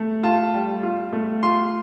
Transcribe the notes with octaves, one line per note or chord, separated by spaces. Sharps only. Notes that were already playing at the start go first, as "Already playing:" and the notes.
Already playing: A3
F4 A5
G3
F4
A3
F4 C6